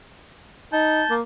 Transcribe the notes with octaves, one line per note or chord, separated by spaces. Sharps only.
D#4 A5 G6
A#3